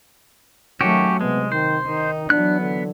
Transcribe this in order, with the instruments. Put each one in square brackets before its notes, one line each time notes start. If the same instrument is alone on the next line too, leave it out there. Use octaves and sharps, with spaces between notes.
[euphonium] D#3 [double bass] F#3 A3 [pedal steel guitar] C#4 F#4 G4
[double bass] C3 [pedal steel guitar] G#3 [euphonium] B3
[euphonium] D#3 [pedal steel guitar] C5
[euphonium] D#3 [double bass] D#4
[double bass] E3 F#3 [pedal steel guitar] B3 F#6 [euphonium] D4
[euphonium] D3